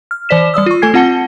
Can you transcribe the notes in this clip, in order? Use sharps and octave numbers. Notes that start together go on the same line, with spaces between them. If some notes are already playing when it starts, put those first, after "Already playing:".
F6
E3 C5 D5 B6 E7
G3 D5 D#6 E6
F4 C#6
A3 A4 G#5 G#6 C7
C4 F4 F#5 A5 C#7 G7